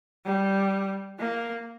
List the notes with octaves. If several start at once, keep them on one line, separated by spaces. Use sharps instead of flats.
G3
A#3